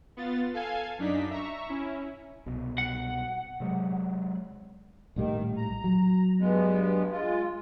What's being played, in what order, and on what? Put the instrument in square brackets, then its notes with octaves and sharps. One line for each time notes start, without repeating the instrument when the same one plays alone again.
[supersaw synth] B3 F4 A6
A4 F5 G#5 G#6
F#2 D4 D#4 B6
E5 A#5 C#6
C#4 E4
[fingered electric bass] C2 B2
[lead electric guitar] F#5
[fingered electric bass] C3 F#3 G#3
[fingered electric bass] A#1 A2 G3 [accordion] D#3
[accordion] A#5
[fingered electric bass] F#3
[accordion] G2 G#3 B3
G#3 F4